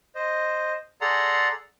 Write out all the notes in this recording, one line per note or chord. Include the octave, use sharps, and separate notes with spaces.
C5 D#5
G#4 A4 D5 F#5 A#5 C6